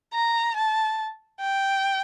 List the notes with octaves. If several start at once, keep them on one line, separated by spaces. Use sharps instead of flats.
A#5
A5
G5